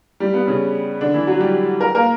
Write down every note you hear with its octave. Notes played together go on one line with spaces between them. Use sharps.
G3 G4
B3
C#3 C#4
D3 D4
E3 E4
F#3 F#4
G3 G4
A#4
A#3 A#4